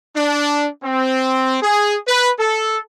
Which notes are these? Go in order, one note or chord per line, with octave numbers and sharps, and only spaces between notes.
D4
C4
G#4
B4
A4